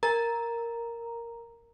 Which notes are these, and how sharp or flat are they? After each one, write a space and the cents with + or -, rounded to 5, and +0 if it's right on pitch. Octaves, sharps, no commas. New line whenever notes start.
A#4 +0 A#5 +0